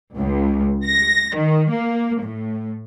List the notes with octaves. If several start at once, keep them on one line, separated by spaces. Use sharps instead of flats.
C#2
A#6
D#3
A#3
A2